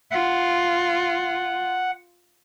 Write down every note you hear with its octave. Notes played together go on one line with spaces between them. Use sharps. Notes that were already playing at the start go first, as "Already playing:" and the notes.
F4 F#5